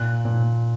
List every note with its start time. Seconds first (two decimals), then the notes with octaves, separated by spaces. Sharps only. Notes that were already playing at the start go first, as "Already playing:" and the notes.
Already playing: A#2 F#6
0.25 A#2